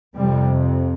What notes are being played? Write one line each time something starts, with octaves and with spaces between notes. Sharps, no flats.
F2 C3 G3